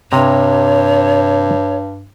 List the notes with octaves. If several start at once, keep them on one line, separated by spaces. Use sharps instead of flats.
G2 C3 C#5 A#5